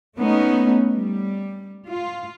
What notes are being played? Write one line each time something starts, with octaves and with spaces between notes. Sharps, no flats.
A3 B3 C#4 D#4
G3
F4